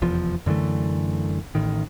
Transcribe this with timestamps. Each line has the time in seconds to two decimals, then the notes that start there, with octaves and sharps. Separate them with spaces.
0.02 F1 E2 F3
0.46 F#2 D3 E3 A3
1.55 A1 A2 D#3